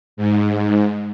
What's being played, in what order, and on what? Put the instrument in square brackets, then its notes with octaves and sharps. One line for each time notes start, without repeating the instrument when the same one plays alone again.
[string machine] G#2